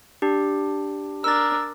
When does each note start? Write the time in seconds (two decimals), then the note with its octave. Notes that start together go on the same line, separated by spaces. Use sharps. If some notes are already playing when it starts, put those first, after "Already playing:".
0.22 D4 G4
1.24 D4 A#4 E6 A6